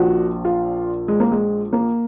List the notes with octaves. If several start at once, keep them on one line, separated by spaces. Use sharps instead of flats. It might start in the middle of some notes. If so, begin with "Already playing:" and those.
Already playing: A#1 A#2 F3 F#4
F4
G#3
A#3
G#3
A#3